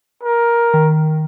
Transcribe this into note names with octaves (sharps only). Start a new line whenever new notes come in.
A#4
D#3